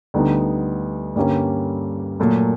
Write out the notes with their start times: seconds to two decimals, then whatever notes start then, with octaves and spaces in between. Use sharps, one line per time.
0.14 D2 D3 G3 B3 D#4
1.16 G2 D3 G3 A#3 C#4
2.20 A#2 F#3 A3